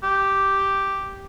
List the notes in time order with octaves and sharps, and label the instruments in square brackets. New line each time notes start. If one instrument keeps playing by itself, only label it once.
[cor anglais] G4